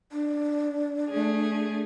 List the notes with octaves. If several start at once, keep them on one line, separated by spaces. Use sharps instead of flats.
D4
A3 G#4